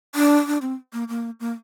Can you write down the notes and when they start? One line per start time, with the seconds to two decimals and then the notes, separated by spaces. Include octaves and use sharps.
0.15 D4
0.47 D4
0.62 C4
0.93 A#3
1.09 A#3
1.40 A#3